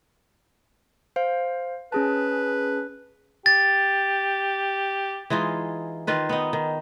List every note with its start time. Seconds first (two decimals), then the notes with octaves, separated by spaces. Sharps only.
1.16 C5 F5
1.92 C#4 G#4 B4 A5
3.46 G4 A6
5.30 E3 G#3 D#4 F4
6.07 D#3 F4 B4
6.29 B3 D#4
6.53 D#3